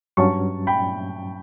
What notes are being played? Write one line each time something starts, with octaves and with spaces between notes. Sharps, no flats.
G2 F#3 C#4 A5 C#6
G5 B5